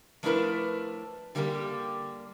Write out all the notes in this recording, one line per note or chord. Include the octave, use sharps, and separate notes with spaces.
F3 A3 D4 E4 A#4 B4
D3 G3 A#3 E4 G4